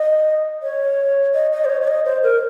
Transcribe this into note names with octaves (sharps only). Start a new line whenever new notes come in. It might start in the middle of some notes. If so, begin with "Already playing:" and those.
Already playing: D#5
C#5
D#5
D#5
C5
C#5
C#5
D#5
C5
A#4